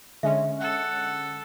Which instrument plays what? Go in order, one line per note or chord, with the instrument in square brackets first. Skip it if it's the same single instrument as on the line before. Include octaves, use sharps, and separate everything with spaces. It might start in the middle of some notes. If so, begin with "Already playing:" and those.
[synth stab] D3 G#3 C#4 [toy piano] E5
[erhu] A4 [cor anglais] F#5